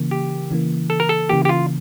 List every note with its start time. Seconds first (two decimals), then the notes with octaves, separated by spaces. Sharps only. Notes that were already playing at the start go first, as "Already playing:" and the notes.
Already playing: C#3 E3 A#3
0.11 G4
0.51 C#3 E3 A#3
0.90 A4
1.00 A#4
1.09 A4
1.29 C#3 E3 A#3 G4
1.45 G4
1.49 F4